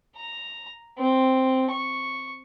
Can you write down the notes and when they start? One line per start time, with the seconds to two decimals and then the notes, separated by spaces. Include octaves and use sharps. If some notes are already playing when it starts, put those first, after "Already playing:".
0.17 A#5
0.98 C4
1.70 C#6